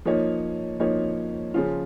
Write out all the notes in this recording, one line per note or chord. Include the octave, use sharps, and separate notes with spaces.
F3 A#3 D#4 C#5
F3 A#3 D#4 C#5
C#3 F3 C#4 F4